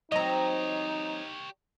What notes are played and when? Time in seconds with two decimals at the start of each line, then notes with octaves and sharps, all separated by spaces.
0.12 F#3 C4 D#4 G4 C#5 D#5 A#5